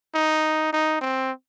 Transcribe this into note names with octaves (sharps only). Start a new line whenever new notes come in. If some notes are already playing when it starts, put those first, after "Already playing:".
D#4
D#4
C4